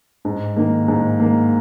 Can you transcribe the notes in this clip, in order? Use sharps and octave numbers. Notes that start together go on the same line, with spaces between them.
G#2
D#3 A#3
G#2
D#3 A#3